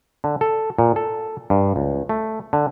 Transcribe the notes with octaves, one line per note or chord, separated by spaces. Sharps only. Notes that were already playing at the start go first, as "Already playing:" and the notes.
D3
A4
A#2
A4
G2
C#2
A3
D3